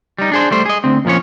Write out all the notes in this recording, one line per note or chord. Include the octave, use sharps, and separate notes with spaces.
G3 D#4
D4 G#4 C5
G3 A3 C5
G#4 D#5
D2 C4
F2 A#2 F3 C#4 C#5